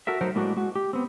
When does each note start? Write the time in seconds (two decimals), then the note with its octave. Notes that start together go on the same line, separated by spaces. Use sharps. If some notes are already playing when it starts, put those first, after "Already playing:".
0.07 F#4 A4 A#4 E5
0.21 F#3 A3 D#4 F#4 A#4 C5
0.35 A2 G#3 A#3 D4 F#4
0.56 G#3 F#4
0.76 G4
0.93 B3 C4